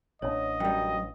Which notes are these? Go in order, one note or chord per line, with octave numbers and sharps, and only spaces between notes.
A1 C4 D4 C#5 D#5
F#2 G3 G5